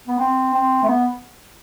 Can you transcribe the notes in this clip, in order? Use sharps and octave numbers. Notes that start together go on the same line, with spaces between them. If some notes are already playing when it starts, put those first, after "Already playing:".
B3
C4
C4
A3
B3